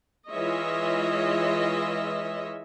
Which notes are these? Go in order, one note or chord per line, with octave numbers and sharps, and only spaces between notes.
E3 G#3 F4 C#5 D#5 E5